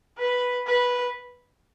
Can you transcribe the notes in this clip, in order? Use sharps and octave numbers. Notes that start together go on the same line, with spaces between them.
B4
B4